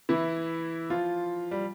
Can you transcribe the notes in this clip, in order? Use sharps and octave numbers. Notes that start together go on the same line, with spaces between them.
E3 E4
F3 F4
G3